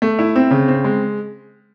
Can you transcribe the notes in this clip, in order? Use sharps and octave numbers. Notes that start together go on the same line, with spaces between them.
A3
E4
C4
C#3
C4
G#3